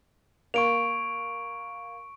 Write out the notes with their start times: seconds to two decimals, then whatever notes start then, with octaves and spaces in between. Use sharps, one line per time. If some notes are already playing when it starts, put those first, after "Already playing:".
0.54 A#3 C#6 D7 F7